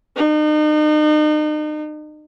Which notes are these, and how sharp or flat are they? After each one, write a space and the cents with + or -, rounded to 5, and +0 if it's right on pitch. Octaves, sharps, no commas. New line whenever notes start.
D#4 -40